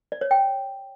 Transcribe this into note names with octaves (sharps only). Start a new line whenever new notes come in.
D5
C#5
G5